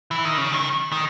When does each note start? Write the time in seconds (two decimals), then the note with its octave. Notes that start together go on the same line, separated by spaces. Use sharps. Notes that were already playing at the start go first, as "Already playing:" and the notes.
0.11 E3
0.25 D#3
0.38 C#3
0.52 D#3
0.92 D#3